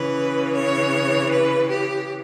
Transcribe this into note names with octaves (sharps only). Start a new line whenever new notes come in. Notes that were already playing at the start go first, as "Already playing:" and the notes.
Already playing: C#3 E3 B4
C#5
B4
G4